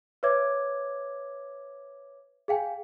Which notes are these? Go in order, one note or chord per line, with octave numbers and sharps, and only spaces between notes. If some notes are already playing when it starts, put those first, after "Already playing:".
B4 C#5 E5 D6 G#6
G#4 F5 G5 G#5